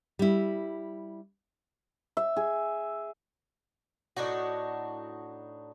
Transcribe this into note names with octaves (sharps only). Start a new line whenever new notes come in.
G3 E4
E5
G#4
A2 D4 D#4 F#4